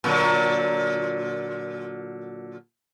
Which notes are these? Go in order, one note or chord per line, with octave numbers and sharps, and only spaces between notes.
A#2 D3 F#3